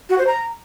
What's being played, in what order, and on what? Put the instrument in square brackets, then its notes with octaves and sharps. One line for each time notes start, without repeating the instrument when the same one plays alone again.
[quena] F#4
C5
A#5